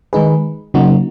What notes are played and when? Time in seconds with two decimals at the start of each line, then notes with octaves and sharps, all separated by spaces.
0.13 D#3 G#3 D#4 G#4 B4
0.74 C#3 F#3 A#3 D#4 F#4